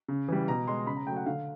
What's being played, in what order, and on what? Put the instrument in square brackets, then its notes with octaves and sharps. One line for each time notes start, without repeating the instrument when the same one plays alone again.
[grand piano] C#3
E3 G3
B2 A#5
G#3 C6
C#3 B5
A#5
F#3 A3 G5
F#5
D3 F5